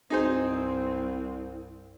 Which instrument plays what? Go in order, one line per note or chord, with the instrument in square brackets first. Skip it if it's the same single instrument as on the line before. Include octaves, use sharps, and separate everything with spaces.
[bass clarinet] C2 [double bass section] G2 C4 [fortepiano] D#4 G#4 C5